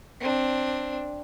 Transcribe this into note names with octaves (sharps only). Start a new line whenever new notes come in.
C4 D4